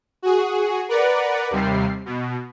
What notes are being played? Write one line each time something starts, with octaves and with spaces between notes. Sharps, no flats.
F#4 G#4
A#4 B4 D5 F#5
D#2 C3 G3 C7
B2